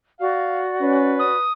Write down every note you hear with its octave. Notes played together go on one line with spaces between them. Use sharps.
F#4 D5 F5
C#4 B4
D#6